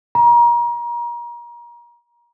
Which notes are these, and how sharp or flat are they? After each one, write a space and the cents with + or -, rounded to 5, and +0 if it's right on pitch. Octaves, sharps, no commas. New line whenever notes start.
A#5 +30